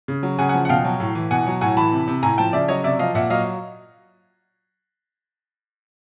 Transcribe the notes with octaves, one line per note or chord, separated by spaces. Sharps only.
C#3
F#3
C#3 F#5 G#5
F#5 G#5
F3
F#5
B2 F5 G5
F#3
A2
E3
B2 F#5 G#5
F#3
A2 F#5 G#5
E3 A5 B5
C3
C3
A2 G#5 A#5
F3 G5 A5
C#3 D5 E5
F#3 C#5 D#5
C3 D5 E5
F3 D#5 F5
A#2 E5 F#5
F#3 D#5 F5